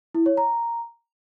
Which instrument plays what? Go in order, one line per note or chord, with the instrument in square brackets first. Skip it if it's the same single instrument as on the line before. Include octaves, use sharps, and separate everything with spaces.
[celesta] E4
C#5
A#5